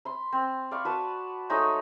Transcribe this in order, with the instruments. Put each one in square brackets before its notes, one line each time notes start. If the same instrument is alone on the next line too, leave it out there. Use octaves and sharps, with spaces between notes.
[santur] B5 C6
C4
D5 F5 B5 C#6
F#4 B4 A5
G#3 A3 D#4 C#5